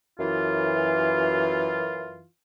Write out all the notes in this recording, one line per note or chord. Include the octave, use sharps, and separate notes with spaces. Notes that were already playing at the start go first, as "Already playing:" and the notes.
F#2 E3 F4